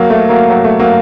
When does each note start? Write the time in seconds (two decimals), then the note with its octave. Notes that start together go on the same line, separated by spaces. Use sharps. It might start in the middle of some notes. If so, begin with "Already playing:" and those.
Already playing: F#3 A#3
0.10 A3
0.29 F#3 A#3
0.50 F#3
0.64 A3
0.79 F#3 A#3